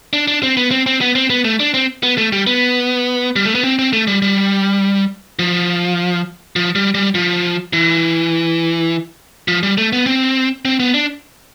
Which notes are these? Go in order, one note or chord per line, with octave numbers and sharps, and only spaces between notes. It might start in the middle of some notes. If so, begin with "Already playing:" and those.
D4
D4
C4
B3
C4
C4
B3
C4
B3
A3
D4
C4
B3
A3
G3
B3
G3
A3
B3
C4
C4
A3
G3
G3
F3
F3
G3
G3
F3
E3
F3
G3
A3
B3
C4
C4
B3
D4